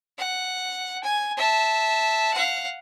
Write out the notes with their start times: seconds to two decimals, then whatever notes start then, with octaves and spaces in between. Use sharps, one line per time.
0.18 F#5
1.03 G#5
1.37 E5 A5
2.33 F5 F#5